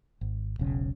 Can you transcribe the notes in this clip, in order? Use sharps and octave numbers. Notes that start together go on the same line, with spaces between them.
G#1
E1 B1 C#3